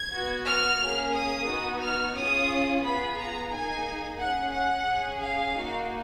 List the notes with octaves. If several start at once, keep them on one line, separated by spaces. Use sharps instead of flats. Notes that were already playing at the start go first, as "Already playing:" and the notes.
Already playing: G#6
B3 F#4
F6
A#3 C#4 G#4
D#6
B3 D#4 F#4
F6
C#4 F4 G#4 D#6
B3 F4 G#4 B5
A#5
A#3 D#4 G#4 G#5
C#4 G#4 F#5
F#5
C#4 G#4
F5
A#3 D#4 F#4